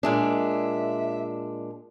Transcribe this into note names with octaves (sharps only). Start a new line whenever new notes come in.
A#2 G#3 D4 E5